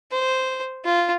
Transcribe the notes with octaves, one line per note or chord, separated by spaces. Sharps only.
C5
F4